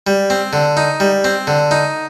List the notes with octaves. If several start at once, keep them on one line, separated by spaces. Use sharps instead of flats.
G3
C4
D3
D#4
G3
C4
D3
D#4